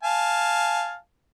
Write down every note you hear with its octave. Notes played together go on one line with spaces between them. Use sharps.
F5 G#5 A5